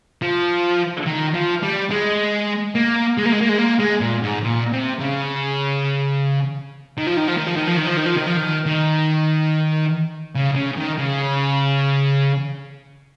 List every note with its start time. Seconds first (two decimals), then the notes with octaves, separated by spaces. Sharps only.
0.22 F3
1.07 D#3
1.35 F3
1.63 G3
1.91 G#3
2.75 A#3
3.18 G#3
3.26 A#3
3.33 G#3
3.41 A#3
3.49 G#3
3.59 A#3
3.80 G#3
4.01 A#2
4.23 G#2
4.44 A#2
4.72 C3
4.99 C#3
6.97 D#3
7.06 F3
7.17 D#3
7.28 F3
7.37 D#3
7.46 F3
7.56 D#3
7.67 F3
7.77 D#3
7.86 F3
7.97 D#3
8.06 F3
8.17 D#3
8.26 F3
8.37 D#3
8.66 D#3
10.35 C#3
10.55 C#3
10.77 D#3
10.98 C#3